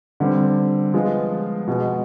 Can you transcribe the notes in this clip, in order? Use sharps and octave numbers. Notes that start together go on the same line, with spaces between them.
D3 G3 C4
F3 G#3 B3 F4
B2 G#3 B3